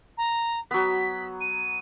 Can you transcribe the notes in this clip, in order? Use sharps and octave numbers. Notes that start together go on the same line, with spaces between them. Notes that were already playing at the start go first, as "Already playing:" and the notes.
A#5
F#3 B3 B6
D#7